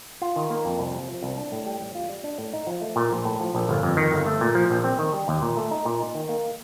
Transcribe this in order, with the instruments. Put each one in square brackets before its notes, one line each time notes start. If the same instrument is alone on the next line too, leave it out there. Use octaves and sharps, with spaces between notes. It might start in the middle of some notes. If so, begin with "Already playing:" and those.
[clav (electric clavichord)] F4
D#3
A#3
F2
C2
C3
F3
C2
D4
A2
G3
A1
F4
G3
D4
A2
D#4
F3
A3
A#2
A#1
A2
F3
A#1
G1
F2
D#3
G1
A3
A#2
F3
A#1
C4
D#3
G3
D#2
A#2
A3
D#4
A#2
D#4
D#3
A#3